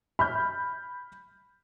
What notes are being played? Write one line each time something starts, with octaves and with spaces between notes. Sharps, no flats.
B5 F6 G6